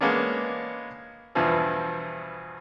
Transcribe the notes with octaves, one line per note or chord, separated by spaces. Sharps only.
G#3 A#3 B3 C#4 D4
E2 G2 B2 E3 F3